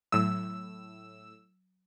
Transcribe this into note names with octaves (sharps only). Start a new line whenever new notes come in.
A2 F#3 E6